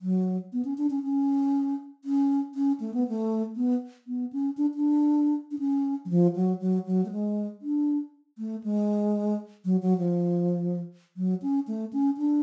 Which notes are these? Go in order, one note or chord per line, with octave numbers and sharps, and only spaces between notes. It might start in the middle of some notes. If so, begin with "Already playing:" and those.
F#3
B3
C#4
D4
C#4
C#4
C#4
C#4
A3
B3
A3
B3
B3
C#4
D4
D4
D4
C#4
F#3
F3
F#3
F#3
F#3
A3
G#3
D4
A3
G#3
F#3
F#3
F3
F#3
C#4
A3
C#4
D4